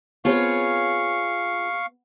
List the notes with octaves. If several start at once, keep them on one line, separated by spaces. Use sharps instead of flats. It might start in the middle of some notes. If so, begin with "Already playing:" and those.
B3 C4 F4 G#4 C#5 F5 G5 C#6